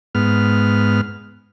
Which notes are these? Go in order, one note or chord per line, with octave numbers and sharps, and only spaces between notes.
G#2 B3 F6